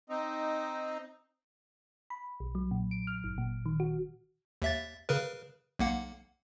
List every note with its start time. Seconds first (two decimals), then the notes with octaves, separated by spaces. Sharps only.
0.09 C4 D#4
2.10 B5
2.40 B1
2.55 F#3
2.71 A#2
2.91 D7
3.07 F6
3.24 G1
3.38 A#2
3.66 D#3
3.80 F#4
4.62 D#2 E5 A6
5.09 C#3 A#4 B4
5.79 B1 A#3 F#5